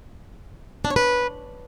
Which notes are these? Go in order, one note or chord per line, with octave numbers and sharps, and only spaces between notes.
D4
C#5
B4